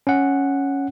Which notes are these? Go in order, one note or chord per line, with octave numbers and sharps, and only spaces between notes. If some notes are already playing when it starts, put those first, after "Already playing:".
C#4 F#5